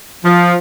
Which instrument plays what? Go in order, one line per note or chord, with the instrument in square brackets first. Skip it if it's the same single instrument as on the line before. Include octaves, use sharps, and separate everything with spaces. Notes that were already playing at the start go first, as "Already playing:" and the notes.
[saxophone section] F3